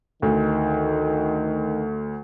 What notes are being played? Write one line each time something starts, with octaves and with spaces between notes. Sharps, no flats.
D2 D#3